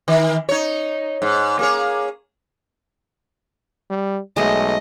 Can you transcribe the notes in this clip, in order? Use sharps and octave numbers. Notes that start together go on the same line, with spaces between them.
D#3
D#4 C#5
G#2
A#3 G#4 C#5
G3
B1 G#3 A3 D#5